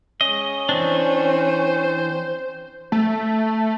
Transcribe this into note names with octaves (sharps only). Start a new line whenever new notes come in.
G#3 C#4 D#5
E3 C4 D4 C5
A3